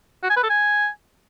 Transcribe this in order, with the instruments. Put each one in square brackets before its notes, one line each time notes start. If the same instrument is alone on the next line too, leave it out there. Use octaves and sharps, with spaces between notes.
[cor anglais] F#4
G#5
B4
A4
G#5